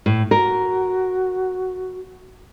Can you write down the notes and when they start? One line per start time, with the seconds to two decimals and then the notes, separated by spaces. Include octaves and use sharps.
0.06 A2
0.31 F#4 A#4